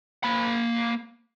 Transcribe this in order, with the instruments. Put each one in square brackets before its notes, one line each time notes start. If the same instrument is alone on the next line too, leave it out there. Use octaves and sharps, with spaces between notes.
[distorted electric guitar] A#3 B5